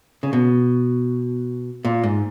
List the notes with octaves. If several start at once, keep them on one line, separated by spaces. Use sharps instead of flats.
C#3
B2
A#2
G#2